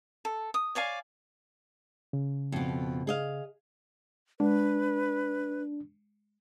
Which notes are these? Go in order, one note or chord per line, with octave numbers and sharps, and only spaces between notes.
A4
D#6
C#5 D5 F5 G#5
C#3
F2 B2
G#4 D#5 F5
G#3 D4 B4